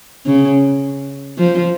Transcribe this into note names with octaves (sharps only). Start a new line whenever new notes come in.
C#3
F3